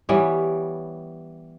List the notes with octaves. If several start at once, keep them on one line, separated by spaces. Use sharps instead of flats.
E3 G3 B3 C#5